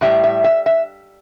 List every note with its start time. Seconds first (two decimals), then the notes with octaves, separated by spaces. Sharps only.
0.01 A2 G3 E5
0.24 E5
0.44 E5
0.66 E5